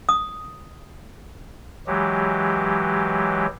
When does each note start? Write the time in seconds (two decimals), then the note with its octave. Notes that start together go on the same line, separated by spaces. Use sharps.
0.09 D#6
1.87 E3 F#3 G#3 G4